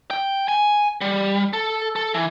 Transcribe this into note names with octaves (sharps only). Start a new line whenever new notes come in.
G5
G#5
G3
A4
A4
E3